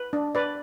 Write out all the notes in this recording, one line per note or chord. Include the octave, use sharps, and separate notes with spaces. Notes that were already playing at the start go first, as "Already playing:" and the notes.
Already playing: B4
D4
B4 D5